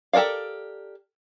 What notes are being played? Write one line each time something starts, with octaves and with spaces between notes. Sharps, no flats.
G4 A4 A#4 D5 F5